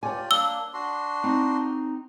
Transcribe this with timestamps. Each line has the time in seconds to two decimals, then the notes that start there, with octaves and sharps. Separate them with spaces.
0.03 F4 G4 C#5 D5 G#5
0.31 A#3 D4 E6 G7
0.74 D4 F#4 C6
1.24 C4 D#4